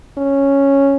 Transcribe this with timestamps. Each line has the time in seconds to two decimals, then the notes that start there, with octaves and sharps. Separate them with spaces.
0.18 C#4